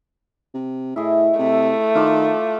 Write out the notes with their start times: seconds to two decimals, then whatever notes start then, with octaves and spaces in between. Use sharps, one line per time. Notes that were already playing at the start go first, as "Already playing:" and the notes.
0.54 C3
0.96 A2 E4 G#4 D#5
1.39 C3 A3
1.95 D#3 F4 D5 A5